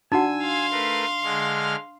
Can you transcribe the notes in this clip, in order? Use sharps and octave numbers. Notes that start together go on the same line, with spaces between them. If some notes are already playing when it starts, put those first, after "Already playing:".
D4 D#4 F#4 F#5 G#5 E6
F5 C6
A3 A#4 B4
D3 G#3 F6